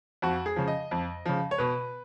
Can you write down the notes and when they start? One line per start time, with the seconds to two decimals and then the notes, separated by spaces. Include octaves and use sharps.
0.22 F2 F#4
0.46 G#4
0.56 C#3 F3
0.68 D#5
0.91 F2
1.26 C#3 F3
1.51 C#5
1.58 B2 B4